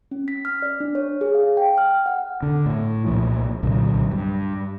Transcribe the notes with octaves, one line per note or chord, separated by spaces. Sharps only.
C#4
B6
F6
D5
D4
C#5
G#4
F5
G5
F6
F#5
D3
A2
C2 A#2 F3
C2 A#2 D3 F#3
G2